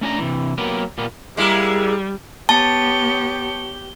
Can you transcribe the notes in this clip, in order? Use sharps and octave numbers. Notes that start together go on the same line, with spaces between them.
A3 C#4 D4 G#5 A#5
C3 E3
F#3 A#3 B3 G4 A#4 B4
A#2 G3 A#3 B3
G3 G#3 A#3 E4
B3 G4 C#5 A5 G7